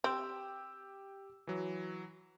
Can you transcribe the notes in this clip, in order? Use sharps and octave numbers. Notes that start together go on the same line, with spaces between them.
C4 G4 G5 E6
E3 F#3